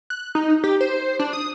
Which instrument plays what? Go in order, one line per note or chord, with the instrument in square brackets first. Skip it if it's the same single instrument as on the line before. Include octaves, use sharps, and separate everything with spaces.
[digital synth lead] F#6
D#4
G4
C5
D4
D#6